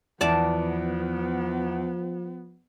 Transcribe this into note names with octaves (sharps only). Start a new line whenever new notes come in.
E2 F3 B3 D5 A5